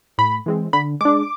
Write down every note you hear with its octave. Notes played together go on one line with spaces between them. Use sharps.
A2 B5
E3 G#3 C4
D3 B5
G#3 D4 D6